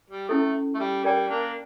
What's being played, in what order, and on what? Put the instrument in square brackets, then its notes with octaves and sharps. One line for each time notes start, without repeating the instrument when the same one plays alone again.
[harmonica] G3
[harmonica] A3 [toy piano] C#4 E4 A4
[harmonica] A3
G3
[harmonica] G3 [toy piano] A#4 D5 G5
[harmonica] A#3 D4